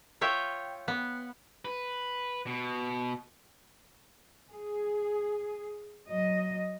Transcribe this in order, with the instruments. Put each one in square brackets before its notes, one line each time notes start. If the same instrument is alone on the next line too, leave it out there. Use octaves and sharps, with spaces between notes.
[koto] F4 C#5 E5 G5
B3
[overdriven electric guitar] B4
B2
[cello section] G#4
F#3 D#5